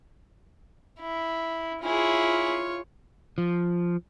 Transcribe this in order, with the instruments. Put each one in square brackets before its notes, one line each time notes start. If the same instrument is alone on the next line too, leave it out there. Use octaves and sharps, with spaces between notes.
[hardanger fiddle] E4
[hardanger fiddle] E4 G#4 [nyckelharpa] F4 C#5
[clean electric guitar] F3